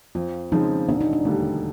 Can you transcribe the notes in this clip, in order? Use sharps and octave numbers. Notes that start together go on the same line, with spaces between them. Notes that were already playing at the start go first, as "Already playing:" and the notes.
F2 F4
C#3 F3 G#3 C4 D#4
E1 D4
D#4
D4
D#2 D3 G3 A3